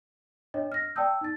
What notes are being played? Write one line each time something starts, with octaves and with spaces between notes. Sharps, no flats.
D4 C#5 D#5
F6 A#6
D5 G5 A5 D#6 E6 G6
D#4 A6